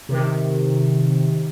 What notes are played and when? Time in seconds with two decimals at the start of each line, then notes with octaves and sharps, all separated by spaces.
0.09 C3 D#3